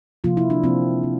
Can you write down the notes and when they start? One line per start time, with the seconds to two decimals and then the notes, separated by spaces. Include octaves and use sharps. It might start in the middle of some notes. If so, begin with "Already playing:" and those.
0.24 C3 F3 A#3 F4
0.37 E4
0.50 D4
0.63 C3 F3 A#3 C4
1.03 C3 F3